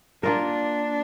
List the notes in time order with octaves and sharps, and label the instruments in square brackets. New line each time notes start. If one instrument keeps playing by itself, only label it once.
[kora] A#3 F4 A#4 [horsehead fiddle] D4